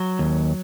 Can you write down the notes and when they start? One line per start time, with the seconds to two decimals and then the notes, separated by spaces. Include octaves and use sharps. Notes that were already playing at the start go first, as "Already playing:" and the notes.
Already playing: F#3
0.19 D#2